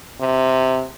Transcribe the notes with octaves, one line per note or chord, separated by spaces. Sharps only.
C3